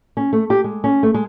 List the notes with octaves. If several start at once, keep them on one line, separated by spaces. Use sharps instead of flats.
C#4
A3
G4
G#3
C#4
A3
G#3